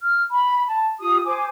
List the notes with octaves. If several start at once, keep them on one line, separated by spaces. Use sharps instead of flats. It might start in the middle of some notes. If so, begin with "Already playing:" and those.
F6
B5
A5
F4 G4 D#6
C5 G#5 D6